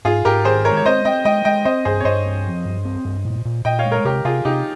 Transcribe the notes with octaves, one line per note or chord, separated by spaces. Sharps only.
G#2 F4 G#4
G#2 G4 A#4
D#3 G#4 C5
G#3 A#4 C#5
C#5
C4 C5 D#5
C4 D#5 G5
G#3 D#5 G5
G#3 D#5 G5
C4 C5 D#5
G2 G#4 C5
C#5
G2 C5 D#5
C4
F3
G2
C4
G2
A#2
A#2
A#2 D#5 G5
C#5 F5
G#3
A#4 C#5
C3 G4 A#4
C3 F4 G#4
C3 D#4 G4